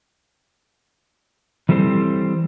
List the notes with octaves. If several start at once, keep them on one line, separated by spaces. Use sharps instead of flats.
E3 G3 C4 A4 C5